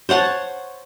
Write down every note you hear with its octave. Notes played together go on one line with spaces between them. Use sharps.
C5 C#5 F#5 A5